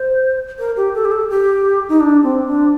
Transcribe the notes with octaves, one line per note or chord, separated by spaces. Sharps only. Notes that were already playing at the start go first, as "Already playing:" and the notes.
Already playing: C5
A#4
G4
A4
G4
A4
G4
D#4
D4
C4
D4